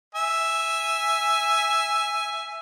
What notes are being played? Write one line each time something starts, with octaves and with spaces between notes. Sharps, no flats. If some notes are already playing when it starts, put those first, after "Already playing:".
E5 G#5